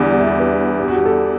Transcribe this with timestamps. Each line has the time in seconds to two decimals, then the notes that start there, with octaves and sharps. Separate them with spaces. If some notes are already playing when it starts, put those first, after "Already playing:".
Already playing: E2 D3 G3 D5
0.19 E5
0.27 D5
0.40 B4
0.79 G4
0.88 F#4
0.96 G4
1.05 A4